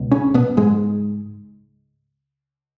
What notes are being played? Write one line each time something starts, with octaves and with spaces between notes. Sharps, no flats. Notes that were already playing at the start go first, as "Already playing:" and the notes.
Already playing: C#2 B2
C#3 C#4
B2 B3
G#2 G#3